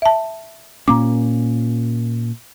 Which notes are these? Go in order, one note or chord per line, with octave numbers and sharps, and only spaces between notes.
E5 A5
A#2 A#3 C#4 A#5 D6